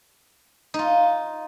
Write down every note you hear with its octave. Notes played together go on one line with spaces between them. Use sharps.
D#4 F4